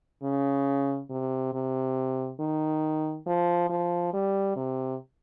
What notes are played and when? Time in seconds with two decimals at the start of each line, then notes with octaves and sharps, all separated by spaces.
0.23 C#3
1.10 C3
1.53 C3
2.40 D#3
3.26 F3
3.70 F3
4.14 G3
4.56 C3